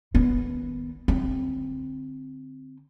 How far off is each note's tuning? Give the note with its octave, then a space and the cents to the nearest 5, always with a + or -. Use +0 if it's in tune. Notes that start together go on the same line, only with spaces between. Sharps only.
D#3 +0 B3 +0
D3 +0 C4 +0